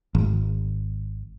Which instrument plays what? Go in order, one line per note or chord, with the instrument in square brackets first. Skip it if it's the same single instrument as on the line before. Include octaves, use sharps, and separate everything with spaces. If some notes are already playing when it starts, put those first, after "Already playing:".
[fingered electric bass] G#1